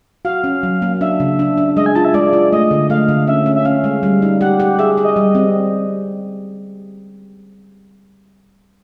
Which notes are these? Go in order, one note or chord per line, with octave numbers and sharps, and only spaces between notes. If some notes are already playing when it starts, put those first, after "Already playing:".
F#4 F5
C#4
F#3
A#3
D4 E5
C#3
D4
D4
G#3 D#5
G#5
F4 A5
E5
G#3 D5
F4
A3 D#5
D3
A3 F5
D3
C#4 E5
C#4
E5
C#4 F5
G#3
G3
D#4
G4 F#5
G4
G#4 E5
G#4
D#5
G3
C4